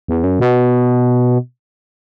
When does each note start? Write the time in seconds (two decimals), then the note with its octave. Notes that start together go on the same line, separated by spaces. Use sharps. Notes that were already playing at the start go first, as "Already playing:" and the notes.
0.08 E2
0.24 F#2
0.40 B2